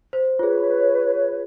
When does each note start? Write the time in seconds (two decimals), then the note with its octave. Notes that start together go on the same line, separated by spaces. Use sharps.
0.13 C5
0.39 F4 G#4 B4 C#5